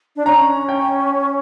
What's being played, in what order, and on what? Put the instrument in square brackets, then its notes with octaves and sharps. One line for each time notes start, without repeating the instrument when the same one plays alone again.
[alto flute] D4
[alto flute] C#4 [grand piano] A#5
[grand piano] G5